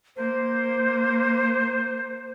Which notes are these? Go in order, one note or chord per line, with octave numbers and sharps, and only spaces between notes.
A#3 C5